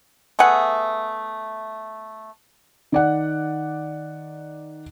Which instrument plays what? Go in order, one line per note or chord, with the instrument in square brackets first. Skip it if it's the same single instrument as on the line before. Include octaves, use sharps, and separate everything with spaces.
[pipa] A3 B3 G#4 F#5
[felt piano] D#3 D5 F#5